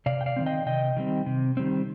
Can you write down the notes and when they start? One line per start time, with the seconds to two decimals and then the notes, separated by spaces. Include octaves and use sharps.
0.06 C3 D5 F5
0.21 G5
0.26 D5 F5
0.36 D#3 G3 C4
0.46 D#5 G5
0.66 C3 D#5 G5
0.96 D#3 G3 C4
1.26 C3
1.57 D#3 G3 C4